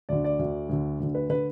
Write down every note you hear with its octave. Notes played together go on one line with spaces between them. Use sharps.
D2 D3 D5
D5
D2 D3
D2 D3
D2 D3
B4
D3 B4